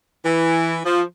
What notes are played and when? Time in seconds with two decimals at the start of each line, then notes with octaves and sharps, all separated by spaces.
0.25 E3
0.84 F3